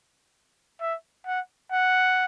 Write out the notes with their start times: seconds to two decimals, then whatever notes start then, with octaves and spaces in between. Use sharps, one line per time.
0.81 E5
1.26 F#5
1.72 F#5